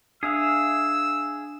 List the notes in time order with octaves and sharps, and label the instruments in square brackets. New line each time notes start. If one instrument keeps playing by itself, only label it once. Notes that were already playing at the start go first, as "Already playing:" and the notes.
[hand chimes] D4 G#5 D#6 [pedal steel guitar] G#4 E5 F5 [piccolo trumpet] E6